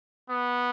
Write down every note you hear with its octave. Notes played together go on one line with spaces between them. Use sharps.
B3